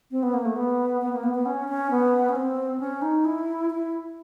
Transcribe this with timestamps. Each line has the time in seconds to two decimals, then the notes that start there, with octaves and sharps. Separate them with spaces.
0.11 C4
0.23 B3
0.34 A#3
0.46 A3
0.56 B3
1.01 B3
1.13 A#3
1.23 B3
1.35 B3
1.46 C#4
1.69 C#4
1.91 B3
2.29 C#4
2.36 C4
2.80 C#4
3.02 D#4
3.25 E4
3.70 E4